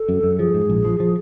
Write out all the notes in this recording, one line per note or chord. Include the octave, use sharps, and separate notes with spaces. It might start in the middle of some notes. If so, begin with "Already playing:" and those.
Already playing: A4
F#2
F#2
F3 G#4
G#2
A#1
F3
F3